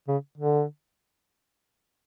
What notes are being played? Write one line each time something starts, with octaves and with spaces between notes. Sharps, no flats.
C#3
D3